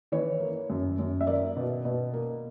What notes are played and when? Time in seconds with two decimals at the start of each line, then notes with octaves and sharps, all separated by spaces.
0.12 E3 C#5
0.40 A#3
0.70 F#2
0.99 F#2
1.21 E5
1.27 A#3 D5
1.56 B2
1.85 B2
2.13 A#3